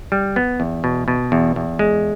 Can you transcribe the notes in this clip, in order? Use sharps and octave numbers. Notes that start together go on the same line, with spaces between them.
G3
B3
E2
B2
B2
E2
E2
G#3